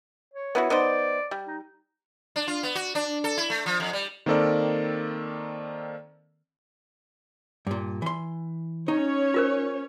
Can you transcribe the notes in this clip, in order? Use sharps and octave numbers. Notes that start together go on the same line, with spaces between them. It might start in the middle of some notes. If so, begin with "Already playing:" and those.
C#5
B3 E4 F#4
B3 D#4 C5 D5
G3
D#4
D4
F4
B3
F#4
D4
A4
E4
A3
F3
F2
G3
D#3 A#3 C4 A4 A#4 D5
G2 A#2
E3 C6
C#4 D#4 C#5
F4 A#4 C5